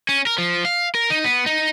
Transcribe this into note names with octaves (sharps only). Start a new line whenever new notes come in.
C#4
A#4
F3
F5
A#4
D#4
B3
D#4